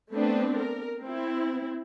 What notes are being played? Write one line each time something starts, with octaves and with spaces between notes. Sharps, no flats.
A3 B3 C4 D4 B4
A#4
C4 E4